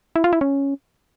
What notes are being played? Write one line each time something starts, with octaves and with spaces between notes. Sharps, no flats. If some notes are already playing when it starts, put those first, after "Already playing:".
E4
F4
E4
C#4